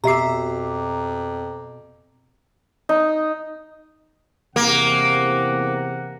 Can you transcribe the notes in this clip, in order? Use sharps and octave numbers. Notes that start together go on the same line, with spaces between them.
F2 B2 G4 E5 A#5 D6 C7
D#4
E2 C3 A#3 F#5